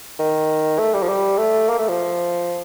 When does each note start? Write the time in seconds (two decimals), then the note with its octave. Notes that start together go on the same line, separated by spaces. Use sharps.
0.19 D#3
0.79 A3
0.94 G3
1.02 F3
1.09 G3
1.38 A3
1.69 A#3
1.78 A3
1.89 F3